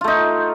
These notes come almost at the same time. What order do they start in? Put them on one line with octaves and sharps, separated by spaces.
F4 A3 D#4